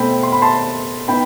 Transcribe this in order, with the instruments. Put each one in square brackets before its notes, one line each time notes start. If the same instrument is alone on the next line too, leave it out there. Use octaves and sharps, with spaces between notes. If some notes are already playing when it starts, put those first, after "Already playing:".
Already playing: [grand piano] B2 A3 C4 G5 B5
C6
B5
A5 C6
B3 D#4 G5 B5